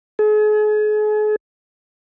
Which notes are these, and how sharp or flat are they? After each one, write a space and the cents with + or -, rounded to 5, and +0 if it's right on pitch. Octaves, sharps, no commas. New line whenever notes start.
G#4 +40